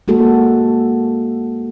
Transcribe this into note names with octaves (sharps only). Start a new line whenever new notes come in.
G#3 A#3 F#4 A4